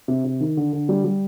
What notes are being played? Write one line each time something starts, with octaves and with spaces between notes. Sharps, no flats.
C3
C3
D#3
D3
D3
G3
G3